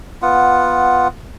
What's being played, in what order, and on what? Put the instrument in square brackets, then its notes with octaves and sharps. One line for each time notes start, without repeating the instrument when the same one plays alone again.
[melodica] B3 F4 F#5